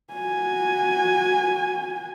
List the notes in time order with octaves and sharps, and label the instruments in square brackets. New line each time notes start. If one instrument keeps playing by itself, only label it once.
[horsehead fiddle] F#4 G#5